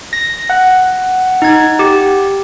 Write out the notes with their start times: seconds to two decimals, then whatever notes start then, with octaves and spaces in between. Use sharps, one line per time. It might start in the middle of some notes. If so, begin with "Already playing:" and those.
0.13 A#6
0.50 F#5
1.42 D#4 G#6
1.79 G4